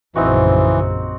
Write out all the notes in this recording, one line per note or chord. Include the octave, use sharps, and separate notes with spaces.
A#1 F#2 C#3 E3 C4 D#4 F#4